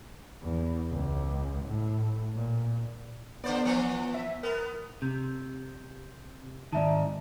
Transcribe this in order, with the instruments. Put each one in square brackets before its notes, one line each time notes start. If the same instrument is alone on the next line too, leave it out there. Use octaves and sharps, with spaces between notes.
[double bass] E2
C#2
A2
A#2
[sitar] D3 C5 D5 [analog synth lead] B3
[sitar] E3 F3
[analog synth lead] E5
[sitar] B3 [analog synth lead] A#4
[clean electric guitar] C3 [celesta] G6
[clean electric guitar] G#2 D#3 [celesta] D5 E5 A5